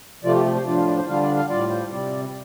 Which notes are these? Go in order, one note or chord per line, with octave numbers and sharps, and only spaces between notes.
C3 F3 A3 F4 D5
G4
G4
C5
A2 F3 D4 F4 D5
F5
D5
C5
D3 G3 D4 F4 F5
D5
F5
A2 G3 F4 D5
C5
C3 G3 C4 D5